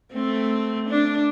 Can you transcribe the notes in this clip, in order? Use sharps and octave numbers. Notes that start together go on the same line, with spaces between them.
A3 C4
D4